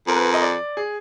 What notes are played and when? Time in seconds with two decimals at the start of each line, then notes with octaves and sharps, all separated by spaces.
0.07 F2 A#4
0.16 B4
0.25 A#4
0.34 D#5
0.41 D5
0.77 G#4